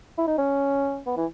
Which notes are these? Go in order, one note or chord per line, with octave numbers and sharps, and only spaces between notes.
E4
D#4
C#4
B3
E3